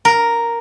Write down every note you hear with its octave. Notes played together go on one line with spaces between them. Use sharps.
A#4